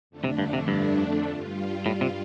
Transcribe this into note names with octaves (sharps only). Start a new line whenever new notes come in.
F2 D3 A3 D4
C3
G2
C3
G2
G2 G3 F4
A2
C3